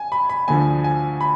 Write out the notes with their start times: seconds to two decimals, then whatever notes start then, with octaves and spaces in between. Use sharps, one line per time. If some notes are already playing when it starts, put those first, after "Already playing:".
Already playing: G#5
0.12 B5
0.30 B5
0.48 D2 D3 F3 G#5
0.84 G#5
1.21 B5